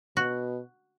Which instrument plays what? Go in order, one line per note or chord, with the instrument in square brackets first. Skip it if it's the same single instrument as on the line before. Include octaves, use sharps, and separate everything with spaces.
[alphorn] B2 [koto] F#4